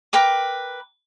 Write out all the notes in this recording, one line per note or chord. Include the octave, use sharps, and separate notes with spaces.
A#4 B4 G5 D6